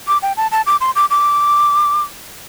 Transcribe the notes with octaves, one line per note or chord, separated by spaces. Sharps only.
D6
G5
A5
A5
D6
C6
D6
D6